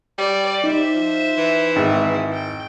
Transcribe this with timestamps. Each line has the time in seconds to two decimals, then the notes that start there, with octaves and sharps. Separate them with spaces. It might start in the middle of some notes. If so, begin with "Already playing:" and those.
0.18 G3 D5
0.64 D#4 C5 E5
0.95 F3
1.37 E3
1.76 G#1
2.33 G5